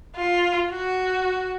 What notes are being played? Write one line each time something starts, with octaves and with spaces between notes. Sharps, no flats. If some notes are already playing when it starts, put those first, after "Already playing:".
F4
F#4